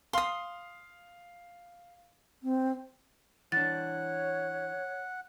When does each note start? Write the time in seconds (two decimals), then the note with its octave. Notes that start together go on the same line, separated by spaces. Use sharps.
0.13 F5 C6 D#6
2.43 C4
3.52 E3 D4 C#5 F#5 A6